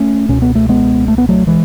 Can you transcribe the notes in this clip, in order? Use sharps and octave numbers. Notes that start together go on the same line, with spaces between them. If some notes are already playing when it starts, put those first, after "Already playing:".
Already playing: A3 C#4
C#2 B2 C#4
B3
A3
G#3 B3
A3
B3
F#3 A3
E3 G#3